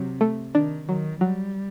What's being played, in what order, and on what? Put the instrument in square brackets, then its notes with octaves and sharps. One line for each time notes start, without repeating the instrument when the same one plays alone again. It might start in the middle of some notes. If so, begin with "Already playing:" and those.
Already playing: [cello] C3 [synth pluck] F#3
[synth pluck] A3
[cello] D#3 [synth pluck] D4
[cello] D#3 [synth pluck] F#3
[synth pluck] F#3 [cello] G3